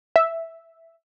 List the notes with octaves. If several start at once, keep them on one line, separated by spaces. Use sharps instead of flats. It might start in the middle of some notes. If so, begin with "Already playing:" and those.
E5